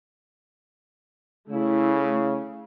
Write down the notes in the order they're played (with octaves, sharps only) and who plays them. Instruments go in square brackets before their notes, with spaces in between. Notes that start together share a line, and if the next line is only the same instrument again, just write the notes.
[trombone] C#3 [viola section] A3 E4